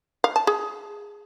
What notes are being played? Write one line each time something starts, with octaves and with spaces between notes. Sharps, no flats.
F5
A5
G#4